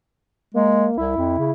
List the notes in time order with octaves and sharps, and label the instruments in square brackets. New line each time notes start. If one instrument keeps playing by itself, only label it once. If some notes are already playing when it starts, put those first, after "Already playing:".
[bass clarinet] G#3 [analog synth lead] A#3
[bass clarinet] C2 [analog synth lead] E4
[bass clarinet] F2
C#3